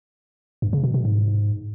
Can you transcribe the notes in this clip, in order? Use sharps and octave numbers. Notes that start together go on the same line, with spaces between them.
G2
C#3
B2
B2
G#2